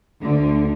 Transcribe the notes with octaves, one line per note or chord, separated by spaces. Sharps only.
D2 D3